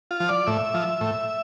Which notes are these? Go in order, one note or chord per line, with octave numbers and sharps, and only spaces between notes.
F4
F3
D5
A2 E5
F3
A2